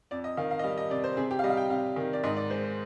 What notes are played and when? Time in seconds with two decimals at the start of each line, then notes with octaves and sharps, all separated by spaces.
0.11 F2 D5
0.24 D#5
0.37 D#3 F5
0.51 F5
0.59 D#5
0.63 G3 F5
0.78 D#5
0.90 C3 D5
1.04 C5
1.17 C3 G#4
1.31 G4
1.39 F5
1.43 G3 D#5
1.50 F5
1.57 G5
1.70 C3 F5
1.96 D#3
2.13 D5
2.24 G#2 D#5
2.37 D5
2.50 G#3 C5
2.63 C5